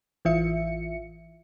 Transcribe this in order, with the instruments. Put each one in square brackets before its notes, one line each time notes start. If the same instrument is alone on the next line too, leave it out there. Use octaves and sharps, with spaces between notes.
[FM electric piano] A1 E3 F4 E5 C#7